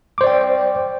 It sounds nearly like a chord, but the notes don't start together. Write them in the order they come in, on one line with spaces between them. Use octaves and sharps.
D6 C5 D5 G5